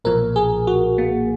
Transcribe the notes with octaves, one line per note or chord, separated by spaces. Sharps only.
B1 A#2 F3 A#4
G#4
F#4
A#3